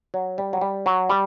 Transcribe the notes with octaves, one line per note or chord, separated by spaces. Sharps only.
F#3
G3
F#3
G3
F#3
G3